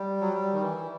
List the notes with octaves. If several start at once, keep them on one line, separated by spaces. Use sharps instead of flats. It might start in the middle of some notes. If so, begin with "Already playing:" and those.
Already playing: G3
F#3
G3
D#3
E3